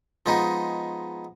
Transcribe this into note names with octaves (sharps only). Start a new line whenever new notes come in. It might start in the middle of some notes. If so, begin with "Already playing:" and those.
F3 G#3 B3 D#4